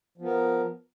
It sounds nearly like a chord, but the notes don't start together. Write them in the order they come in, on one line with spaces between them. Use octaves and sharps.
F3 B3 A#4